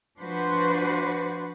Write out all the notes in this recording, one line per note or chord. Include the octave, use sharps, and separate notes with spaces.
F3 D4 F#4 B4 C5